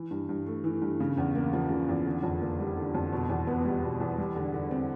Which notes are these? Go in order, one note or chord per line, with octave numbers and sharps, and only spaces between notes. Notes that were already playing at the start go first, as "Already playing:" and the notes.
Already playing: E3
G2
G2
A3
E3
G2
C#3
E2
A#3
F3
C#3
E2
D3
F2
A#3
G3
D3
F2
B2
E2
B3
G3
B2
E2
G3
D3
D3
C4